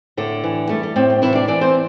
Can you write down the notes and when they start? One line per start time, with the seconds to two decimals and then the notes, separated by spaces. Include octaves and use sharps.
0.17 A2 D3 D4
0.44 E3
0.69 G3 A3
0.83 A3
0.96 A2 C4
1.10 C4
1.22 C3 E3 E4
1.35 D4 D5
1.48 E3 D4 D5
1.61 C4 C5